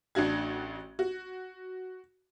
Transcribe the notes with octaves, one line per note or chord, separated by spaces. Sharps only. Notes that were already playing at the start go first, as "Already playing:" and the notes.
A1 D4 F#4 G#6
F#4